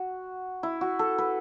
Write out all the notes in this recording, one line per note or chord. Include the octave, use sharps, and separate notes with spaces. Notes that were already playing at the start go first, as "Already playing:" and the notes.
Already playing: F#4
E4
F#4
A4
B4